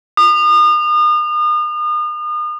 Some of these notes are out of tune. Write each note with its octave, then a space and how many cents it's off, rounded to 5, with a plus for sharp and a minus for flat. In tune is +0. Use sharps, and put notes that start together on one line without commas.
D#6 -40